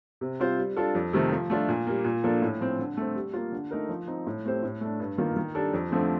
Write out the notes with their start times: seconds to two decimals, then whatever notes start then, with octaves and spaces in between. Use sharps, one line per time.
0.21 C3
0.39 G3 C4 F4 C5
0.58 G3
0.76 D4 F4 A4
0.95 F2
1.13 C3 D#3 A3
1.31 F3
1.50 A3 D4 F4
1.68 A#2
1.87 G3 A#3
2.05 A#2
2.23 F3 A#3 D4 A4
2.42 A2
2.60 F3 C4
2.79 D3
2.97 A3 C4
3.15 G3
3.34 A#3 F4
3.52 D3
3.71 A3 D#4 A#4
3.89 F3
4.08 C4 D#4
4.27 A2
4.45 A3 C4 G4 C5
4.63 A2
4.81 A3 D4
5.00 G2
5.18 D#3 A#3 F4
5.36 D#3
5.55 G3 D4 A4
5.73 F2
5.91 D3 F3 A3 C4